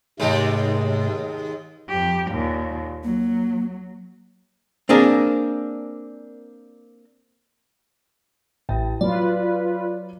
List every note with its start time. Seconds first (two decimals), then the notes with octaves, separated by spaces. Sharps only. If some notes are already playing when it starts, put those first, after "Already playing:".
0.20 D#2 G#2 C3 G#3 A3 G4
1.88 F2 G4
2.31 D#2 A#2
3.04 F#3 A#3
4.89 A#3 C4 D4 G#4 A#4
8.69 A1 A2 G5
9.01 F#3 F4 B4 D5